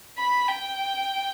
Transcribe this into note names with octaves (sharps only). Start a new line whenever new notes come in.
B5
G5